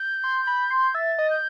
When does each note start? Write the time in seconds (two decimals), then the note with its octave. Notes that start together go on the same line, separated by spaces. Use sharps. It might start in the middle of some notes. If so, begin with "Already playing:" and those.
Already playing: G6
0.24 C6
0.47 B5
0.71 C6
0.94 E5 A6
1.18 D#5
1.30 G6